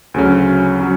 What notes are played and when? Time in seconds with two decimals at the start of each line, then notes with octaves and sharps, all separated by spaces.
0.14 D2 C#3 F#3 C#4
0.80 F#3 C#4